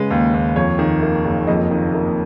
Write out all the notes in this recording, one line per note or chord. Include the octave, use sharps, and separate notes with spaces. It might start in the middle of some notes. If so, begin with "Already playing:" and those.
Already playing: C#3 G#3 B4
D#2
D#2
F2 C#5
D#3
A#3
F#1
F2 D#5
D#3
A#3